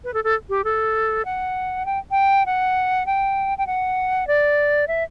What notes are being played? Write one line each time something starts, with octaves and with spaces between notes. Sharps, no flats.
B4
A4
A4
G4
A4
F#5
G5
G5
F#5
G5
G5
F#5
D5
E5